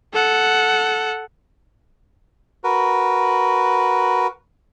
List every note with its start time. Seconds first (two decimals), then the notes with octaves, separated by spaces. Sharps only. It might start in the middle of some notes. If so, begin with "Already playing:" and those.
0.13 A4 F#5
2.64 F#4 A#4 B4